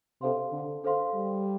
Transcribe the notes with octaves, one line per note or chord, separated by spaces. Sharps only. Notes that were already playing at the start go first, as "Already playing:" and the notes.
C3 D4 A4 C5 F5 C6
D3
D4 A4 C5 F5 C6
G3